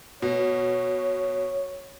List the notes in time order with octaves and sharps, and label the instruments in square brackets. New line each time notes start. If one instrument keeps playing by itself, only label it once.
[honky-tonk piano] B2 [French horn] C#5